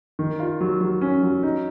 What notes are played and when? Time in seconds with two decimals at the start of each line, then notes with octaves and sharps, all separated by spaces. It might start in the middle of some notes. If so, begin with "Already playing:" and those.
0.19 D#3
0.39 F4
0.61 F#3
0.81 F#3
1.01 C#4
1.23 F#3
1.43 D#4